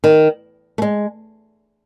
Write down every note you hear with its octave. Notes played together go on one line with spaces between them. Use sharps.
D#3
A3
G#3